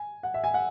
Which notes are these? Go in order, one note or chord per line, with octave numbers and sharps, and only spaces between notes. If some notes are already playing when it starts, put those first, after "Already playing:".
Already playing: G#5
F#5
E5
G#5
F#5